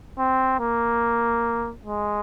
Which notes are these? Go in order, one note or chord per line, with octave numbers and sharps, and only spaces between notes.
C4
A#3
G#3